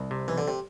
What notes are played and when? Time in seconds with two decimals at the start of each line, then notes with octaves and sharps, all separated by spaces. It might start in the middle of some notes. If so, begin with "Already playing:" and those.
Already playing: C2
0.11 C3
0.28 B1 E3
0.38 D3
0.48 C3